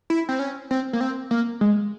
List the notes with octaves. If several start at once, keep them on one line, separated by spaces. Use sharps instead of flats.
E4
C4
C#4
C4
A#3
C4
A#3
G#3